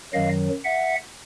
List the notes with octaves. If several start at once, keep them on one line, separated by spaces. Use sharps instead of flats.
F#2 D#3 F#3 D#5 F5
E5 F#5